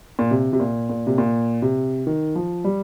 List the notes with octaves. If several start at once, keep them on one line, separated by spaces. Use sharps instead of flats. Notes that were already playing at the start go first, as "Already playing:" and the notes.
A#2
C3
C3
A#2
A#2
C3
A#2
C3
D#3
F3
G3